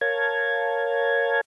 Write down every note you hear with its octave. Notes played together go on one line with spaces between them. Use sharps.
A#4 C#5 F5 A5 G#6